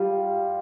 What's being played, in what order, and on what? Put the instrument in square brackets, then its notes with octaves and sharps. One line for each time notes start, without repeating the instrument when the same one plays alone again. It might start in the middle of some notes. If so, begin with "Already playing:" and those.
Already playing: [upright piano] G3 F4